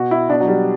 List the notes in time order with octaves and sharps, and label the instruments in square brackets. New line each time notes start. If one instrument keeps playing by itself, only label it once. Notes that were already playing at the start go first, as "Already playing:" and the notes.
Already playing: [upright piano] B2 F#4
E4
B2 D4
F#3
G3